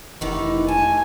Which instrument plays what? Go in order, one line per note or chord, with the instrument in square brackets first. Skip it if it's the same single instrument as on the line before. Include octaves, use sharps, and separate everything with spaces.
[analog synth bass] F1 [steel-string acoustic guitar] D#3 E3 D#4
[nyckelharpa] G#5 [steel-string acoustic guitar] A5